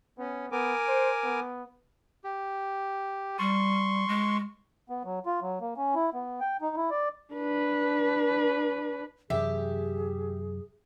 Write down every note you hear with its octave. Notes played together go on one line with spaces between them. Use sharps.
B3 C#4
B3 A#4 G#5 D6
C5
B3
G4
G3 C6 C#6
G#3
B3
F#3
F4
F#3
A#3
C#4
E4
B3
G5
D#4
E4
D5
D4 B4
F#2 C3 E3 G4 G#4 E5